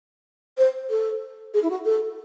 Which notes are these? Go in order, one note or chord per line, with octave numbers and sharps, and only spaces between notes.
C5
A4
G#4
E4
F#4
A4